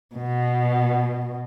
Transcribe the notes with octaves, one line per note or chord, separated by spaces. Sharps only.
B2